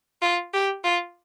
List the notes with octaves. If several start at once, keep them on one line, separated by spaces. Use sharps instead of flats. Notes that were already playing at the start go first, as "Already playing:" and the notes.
F4
G4
F4